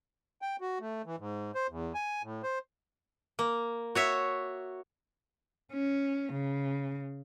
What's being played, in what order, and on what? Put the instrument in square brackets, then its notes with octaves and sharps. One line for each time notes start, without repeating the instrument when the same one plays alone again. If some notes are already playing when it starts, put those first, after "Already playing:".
[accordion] G5
F#4
A3
E3
G#2
C5
E2
G#5
A2
C5
[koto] A#3
F#4 C#5 E5
[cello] C#4
C#3